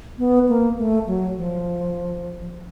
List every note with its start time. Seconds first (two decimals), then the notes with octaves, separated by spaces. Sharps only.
0.18 B3
0.48 A#3
0.78 A3
1.07 F#3
1.37 F3